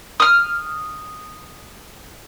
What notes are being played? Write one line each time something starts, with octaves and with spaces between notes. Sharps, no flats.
D#6 F6